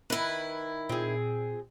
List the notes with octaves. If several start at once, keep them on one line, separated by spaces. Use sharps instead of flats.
D#3 E4 B4
A#2 C4 G#4